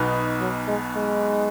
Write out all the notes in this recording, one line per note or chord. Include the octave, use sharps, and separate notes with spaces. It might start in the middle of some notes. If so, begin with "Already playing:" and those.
Already playing: B1 B2 B3 D#4
F#3
G#3
G#3